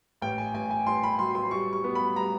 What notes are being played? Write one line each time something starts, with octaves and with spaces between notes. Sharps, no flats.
A1 G5
G#5
A1 G#5
G#5
A1 C6
B5
F#3 C6
C6
G3 C#6
C#6
B3
B5
G3 A#5